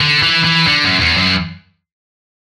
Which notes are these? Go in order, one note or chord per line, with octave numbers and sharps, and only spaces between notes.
D3
E3
E3
D3
F#2
E2
F#2